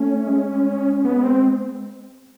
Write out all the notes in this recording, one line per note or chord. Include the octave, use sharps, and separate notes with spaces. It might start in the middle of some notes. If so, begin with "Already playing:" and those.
Already playing: A3 C#4
G#3
B3
C4